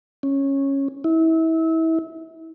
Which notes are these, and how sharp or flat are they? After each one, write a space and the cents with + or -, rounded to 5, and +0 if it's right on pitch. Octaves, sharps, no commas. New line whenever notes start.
C#4 -10
E4 -30